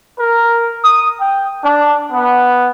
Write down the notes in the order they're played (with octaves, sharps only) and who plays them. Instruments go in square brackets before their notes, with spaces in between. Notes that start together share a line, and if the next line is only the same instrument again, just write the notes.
[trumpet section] A#4
D#6
G5
D4
B3